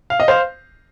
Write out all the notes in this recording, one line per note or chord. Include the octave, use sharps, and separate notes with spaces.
F5
D#5
C5 F5